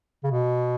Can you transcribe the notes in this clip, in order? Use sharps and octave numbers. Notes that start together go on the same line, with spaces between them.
C#3
B2